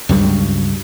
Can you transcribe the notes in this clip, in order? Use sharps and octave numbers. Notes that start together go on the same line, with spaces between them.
C#2 G2 F#3 G3